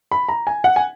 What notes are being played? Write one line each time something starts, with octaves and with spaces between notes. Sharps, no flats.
B5
A#5
G#5
F#5
G#5